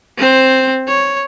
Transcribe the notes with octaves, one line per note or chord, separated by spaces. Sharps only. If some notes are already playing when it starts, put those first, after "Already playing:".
C4 C5
C#5